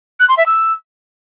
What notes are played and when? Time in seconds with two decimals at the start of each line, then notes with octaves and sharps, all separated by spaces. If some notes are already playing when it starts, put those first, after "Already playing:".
0.19 F#6
0.28 C6
0.37 E5
0.46 E6